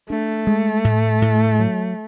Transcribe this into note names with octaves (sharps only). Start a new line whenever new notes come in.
A3 D4
G#3
A2
A2
F#3